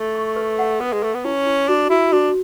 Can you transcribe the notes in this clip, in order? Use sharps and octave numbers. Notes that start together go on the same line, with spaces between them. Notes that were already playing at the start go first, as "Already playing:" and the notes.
Already playing: A3
C#6
B4
F#5
B3 B4
G#3
A3 B4
B3
C#4 E4
E4
D4 F#4
E4 F#4
D4 F#4